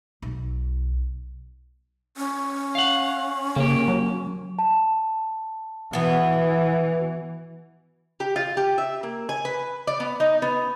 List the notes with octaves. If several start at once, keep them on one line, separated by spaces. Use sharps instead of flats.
B1
C#4
F5 F#5
C#3 A#3 G4
F#3
A5
B2 E3 B3
G4
F4
G4
E5
A#3
G#5
B4
D5
B3
D#4
B3